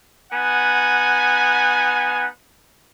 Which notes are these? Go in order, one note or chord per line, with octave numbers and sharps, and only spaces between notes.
B3 D#4 F#5 G#5